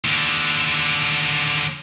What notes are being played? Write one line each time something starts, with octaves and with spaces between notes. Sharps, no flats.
D#2 D3